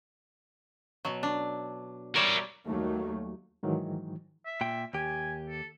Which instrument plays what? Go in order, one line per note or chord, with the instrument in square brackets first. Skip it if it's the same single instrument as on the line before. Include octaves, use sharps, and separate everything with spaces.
[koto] B2 F#3
D4
[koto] G3 C#5 D5 [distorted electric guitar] A#4 E5
[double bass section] D#2 D#3 F#3 G3 A3
[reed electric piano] G#2 D#3 E3 F#3
[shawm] E5
[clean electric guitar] A#2 G5
[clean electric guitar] D#2 G4 [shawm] G#5
[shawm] A4